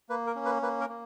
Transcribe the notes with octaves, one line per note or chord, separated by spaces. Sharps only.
A#3 B4
A#4
C#4
B4
A#3 B4
A#4
A#3